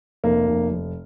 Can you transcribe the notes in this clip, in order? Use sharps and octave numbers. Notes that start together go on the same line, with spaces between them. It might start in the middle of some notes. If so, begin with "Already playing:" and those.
F1 A#3
F1
F1